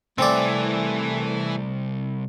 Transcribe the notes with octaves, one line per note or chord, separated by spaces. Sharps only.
C2 E3 A3 C4 D5 G#5